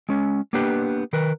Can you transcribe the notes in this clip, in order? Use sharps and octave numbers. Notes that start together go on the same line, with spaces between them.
G#3 C#4
A#3 B3 D4 G4 B4
D#3 A#4 B4